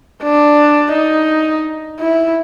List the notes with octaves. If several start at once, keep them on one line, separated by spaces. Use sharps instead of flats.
D4
D#4
E4